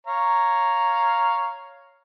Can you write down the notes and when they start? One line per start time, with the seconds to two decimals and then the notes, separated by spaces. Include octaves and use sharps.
0.07 C#5 F5 A#5